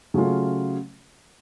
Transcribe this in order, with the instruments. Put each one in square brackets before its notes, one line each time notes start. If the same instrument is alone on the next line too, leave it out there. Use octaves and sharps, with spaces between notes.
[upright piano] C#3 F#3 A3 C#4 F4